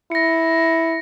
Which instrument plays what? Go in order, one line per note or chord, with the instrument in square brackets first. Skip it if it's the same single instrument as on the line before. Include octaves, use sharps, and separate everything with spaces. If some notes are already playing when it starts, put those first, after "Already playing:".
[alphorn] E4 [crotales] A#6 C#7